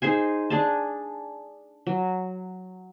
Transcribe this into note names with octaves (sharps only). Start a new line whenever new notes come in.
D#4 G#4 C5 G#5
D4 G#4 A5
F#3